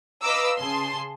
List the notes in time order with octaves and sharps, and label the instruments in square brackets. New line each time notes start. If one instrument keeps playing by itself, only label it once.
[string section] B4 D#5 F5 A#5 D6 E6
C#3 G#4 A5 C6